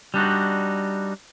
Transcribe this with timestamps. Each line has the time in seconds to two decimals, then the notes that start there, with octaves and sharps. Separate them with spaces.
0.14 G3 D4 D#4 F#4